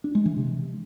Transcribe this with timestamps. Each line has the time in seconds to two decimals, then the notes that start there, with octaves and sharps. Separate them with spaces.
0.04 D4
0.15 G#3
0.26 E3
0.36 C3